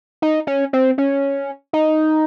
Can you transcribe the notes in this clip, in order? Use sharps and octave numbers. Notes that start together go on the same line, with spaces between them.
D#4
C#4
C4
C#4
D#4